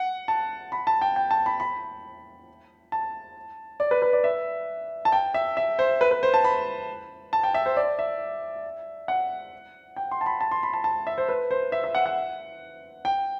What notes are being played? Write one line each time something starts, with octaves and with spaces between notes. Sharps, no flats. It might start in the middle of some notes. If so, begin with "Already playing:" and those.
Already playing: F#5
A5
B5
A5
G5
G5
A5
B5
B5
A5
D5
B4
B4
D5
E5
A5
G5
E5
E5
C5
B4
B4
C5
A5
B5
A5
G5
E5
C5
D5
E5
F#5
G5
C6
A5
B5
A5
C6
B5
A5
A5
E5
C5
B4
C5
E5
E5
F#5
F#5
G5